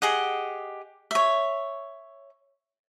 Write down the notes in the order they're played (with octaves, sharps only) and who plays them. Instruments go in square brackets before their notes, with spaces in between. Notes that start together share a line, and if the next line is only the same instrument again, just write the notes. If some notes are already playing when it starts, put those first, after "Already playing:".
[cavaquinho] G4 G#4 D#5 F#5
C#5 E5